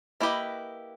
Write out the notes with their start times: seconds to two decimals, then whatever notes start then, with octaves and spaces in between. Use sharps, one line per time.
0.20 A#3 E4 G4 B4 D#5